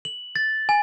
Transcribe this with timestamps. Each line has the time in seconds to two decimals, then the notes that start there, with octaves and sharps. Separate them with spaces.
0.05 F#7
0.36 A6
0.69 G#5